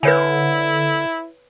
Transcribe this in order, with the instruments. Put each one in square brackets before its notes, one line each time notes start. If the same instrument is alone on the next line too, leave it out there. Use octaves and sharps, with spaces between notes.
[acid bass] D3 [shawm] E4 [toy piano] B4 C#5 G#5